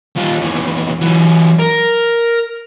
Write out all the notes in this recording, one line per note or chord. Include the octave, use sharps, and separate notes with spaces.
D#2 F4
D#2 E3
E3 F#3
A#4